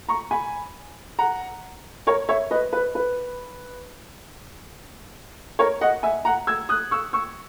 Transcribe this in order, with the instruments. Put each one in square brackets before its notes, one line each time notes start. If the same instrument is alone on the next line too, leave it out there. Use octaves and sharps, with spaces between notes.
[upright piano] A#5 C#6
G#5 B5
F#5 A#5
A#4 C#5
C#5 E5
B4 D#5
B4
B4
A#4 C#5
D#5 F#5
E5 G#5
F#5 A#5
E6 G#6
D#6 F#6
C#6 E6
C#6 E6